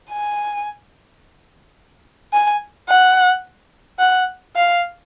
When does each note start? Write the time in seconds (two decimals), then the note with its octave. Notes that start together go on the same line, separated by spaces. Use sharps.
0.11 G#5
2.33 G#5
2.88 F#5
3.99 F#5
4.55 F5